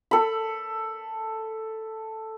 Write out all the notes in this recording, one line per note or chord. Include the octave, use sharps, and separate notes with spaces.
A4 B5